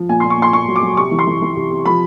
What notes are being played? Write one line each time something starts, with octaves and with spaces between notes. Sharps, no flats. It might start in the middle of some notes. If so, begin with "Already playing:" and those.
Already playing: F3
A#2 G#5
A#2 C6
C#6
A#2 C6
A#2 C#6
F#3
D6
F#3
C3 C#6
E3
C6
E3
E3
C3
C3
F3 B5